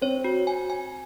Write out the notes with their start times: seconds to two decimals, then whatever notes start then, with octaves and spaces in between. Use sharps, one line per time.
0.01 C4 C#5
0.24 F#4
0.47 G#5
0.70 G#5